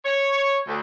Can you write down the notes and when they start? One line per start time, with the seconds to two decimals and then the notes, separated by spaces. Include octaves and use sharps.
0.05 C#5
0.67 D2